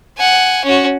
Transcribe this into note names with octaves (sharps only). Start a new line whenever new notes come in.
F#5 G#5
C#4 F#4